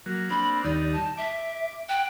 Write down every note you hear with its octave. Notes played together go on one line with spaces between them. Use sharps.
F#3 A#3
A#3 C4 D4 B5
D#2 G3 D#4 D5
A5
E5 D6
F#5 G5